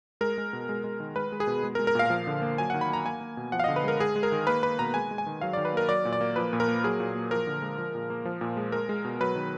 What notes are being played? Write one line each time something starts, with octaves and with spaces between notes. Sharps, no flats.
G#3 A#4
G#3
B2
G#3
G#3
D#3
G#3 B4
G#3
G#4
B2
G#3
A#4
G#3
A#4
A#2 F5
F3
D3
A#3
F#3 G#5
D#3 F#5
B5
A#3 A#5
A#3 G#5
A#3
B2
F3 F#5
F5
D3 D#5
B4
G#3 A#4
G#3 G#4
G#3
A#4
D#3
A#3 B4
A#3 B4
B2 A#5
G#3 G#5
G#3
G#5
D#3
F#3 F5
D#3 D5
B4
A#3 A#4
F#3 D5
A#2
D5
A#3
F3 B4
A#2
A#4
A#3
F#3 G#4
A#2
A#3
F3 A#4
D3
G#3
F3
A#2
A#3
F3
A#2
G#3
G#3 A#4
G#3
B2
F#3 B4
D#3